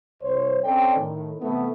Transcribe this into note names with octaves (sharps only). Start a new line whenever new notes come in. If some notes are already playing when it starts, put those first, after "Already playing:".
C2 C5 C#5
C4 C#4 A4 D5 D#5 G5
A2 D#3
C3 E3 A3 B3